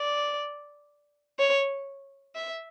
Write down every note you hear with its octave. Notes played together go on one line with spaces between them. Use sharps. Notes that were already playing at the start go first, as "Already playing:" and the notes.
Already playing: D5
C#5
E5